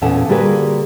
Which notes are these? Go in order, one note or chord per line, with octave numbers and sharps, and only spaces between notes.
E2 A#2 C#4 A4 F#5 A5
D3 G3 A#3 F#4 G#4 B4